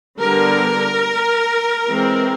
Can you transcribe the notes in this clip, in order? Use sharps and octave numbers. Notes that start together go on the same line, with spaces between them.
D3 G3 B3 D4 A#4
E3 G#3 C4